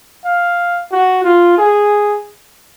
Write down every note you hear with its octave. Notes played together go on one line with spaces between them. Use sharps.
F5
F#4
F4
G#4